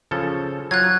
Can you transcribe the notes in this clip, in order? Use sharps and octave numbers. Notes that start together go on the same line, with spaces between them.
C#3 F3 A4
F#3 F4 F#6 G#6